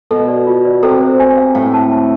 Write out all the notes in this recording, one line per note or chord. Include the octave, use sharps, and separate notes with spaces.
B2 A4
D5
F4
D5
C3 A4
C5
G#5
F5
A2 F5
A5
A5